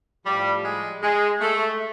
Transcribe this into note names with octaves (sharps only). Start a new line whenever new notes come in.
A2 F3 G3
G#3
G#3
A3